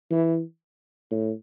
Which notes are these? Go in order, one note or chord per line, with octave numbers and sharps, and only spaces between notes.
E3
A2